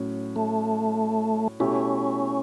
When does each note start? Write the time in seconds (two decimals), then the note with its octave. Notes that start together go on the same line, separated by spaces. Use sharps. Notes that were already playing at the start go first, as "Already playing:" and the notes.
Already playing: A2 F#3 C#4
0.36 A3
1.60 B2 A3 C#4 E4 G4